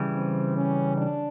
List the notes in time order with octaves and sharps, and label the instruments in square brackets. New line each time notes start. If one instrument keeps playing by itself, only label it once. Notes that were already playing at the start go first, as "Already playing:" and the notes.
Already playing: [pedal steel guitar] C#3 E3 G3
[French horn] C4
C#4
D4